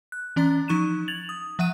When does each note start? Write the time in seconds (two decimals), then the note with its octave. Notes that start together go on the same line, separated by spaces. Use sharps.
0.12 F#6
0.36 E3 C#4 D5 A#5 A6
0.68 F3 D#4 C#6 F#6 D#7 E7
1.08 G#6 A6 F7 F#7
1.29 D#6
1.59 F3 E5 F#5 F#6 D#7